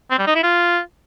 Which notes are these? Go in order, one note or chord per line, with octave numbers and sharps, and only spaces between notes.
C4
G3
D#4
E4
F4